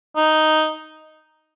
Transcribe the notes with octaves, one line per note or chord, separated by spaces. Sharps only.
D#4